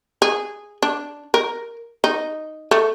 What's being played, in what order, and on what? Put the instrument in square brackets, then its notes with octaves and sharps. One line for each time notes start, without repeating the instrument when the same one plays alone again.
[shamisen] G#4
D4
A#4
D#4
A3